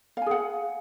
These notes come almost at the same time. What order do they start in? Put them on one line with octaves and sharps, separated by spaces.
F5 G#5 G#4 F#5